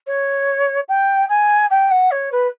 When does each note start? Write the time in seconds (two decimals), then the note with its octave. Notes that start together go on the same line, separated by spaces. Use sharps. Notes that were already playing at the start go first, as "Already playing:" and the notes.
0.07 C#5
0.88 G5
1.29 G#5
1.70 G5
1.91 F#5
2.11 C#5
2.32 B4